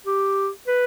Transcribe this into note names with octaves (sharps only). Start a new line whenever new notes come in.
G4
B4